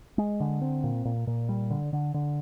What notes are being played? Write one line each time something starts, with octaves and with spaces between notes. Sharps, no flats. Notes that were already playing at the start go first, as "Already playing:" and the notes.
G#3
D3
C4
A#2
A#2
A#2
G3
D3
D3
D3